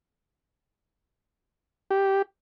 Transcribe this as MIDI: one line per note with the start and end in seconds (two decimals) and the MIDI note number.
1.91 2.22 67